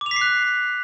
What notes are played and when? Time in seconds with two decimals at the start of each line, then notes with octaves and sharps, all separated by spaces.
0.01 D6
0.06 F7
0.11 B6
0.16 C7
0.21 F#6